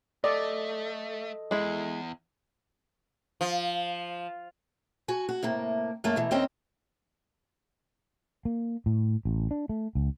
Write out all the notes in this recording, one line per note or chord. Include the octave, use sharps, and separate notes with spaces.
A3 A4 D5 D#5
E2 G#3 E4
F3
F#4 G#5
F#4
A2 C3 A#3
F#2 A3 A#3
B2 E3
D#2 D#3 C4 C#4 D#5 G5
A#3
A2
A1
D4
A3
C#2